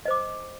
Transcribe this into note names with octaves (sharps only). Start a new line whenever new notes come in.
C5 D#5 D6